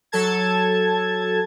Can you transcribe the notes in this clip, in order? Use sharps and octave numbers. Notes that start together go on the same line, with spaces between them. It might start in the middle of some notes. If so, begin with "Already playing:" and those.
F#3 A4 A5 G#6